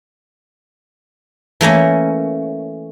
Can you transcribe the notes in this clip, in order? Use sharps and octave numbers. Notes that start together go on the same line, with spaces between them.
E3 A3 A#3 C#4